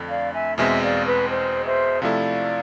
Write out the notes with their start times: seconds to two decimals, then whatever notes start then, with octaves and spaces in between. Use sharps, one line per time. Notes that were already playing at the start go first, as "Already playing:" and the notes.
Already playing: F2 D3 A3
0.09 D5 F5
0.33 E5 G#5
0.57 E2 B2 G#3 C4 E5 G#5
0.82 D5 F5
1.06 B4
1.30 C5
1.66 C5 E5
2.02 C3 F3 A3 E4 A4 D5 F5